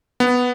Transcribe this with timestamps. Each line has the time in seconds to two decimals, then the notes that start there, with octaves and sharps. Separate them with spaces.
0.20 B3